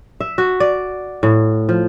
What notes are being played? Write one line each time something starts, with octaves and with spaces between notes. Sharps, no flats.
E5
F#4
D5
A2
F3